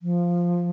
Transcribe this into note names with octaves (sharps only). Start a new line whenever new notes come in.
F3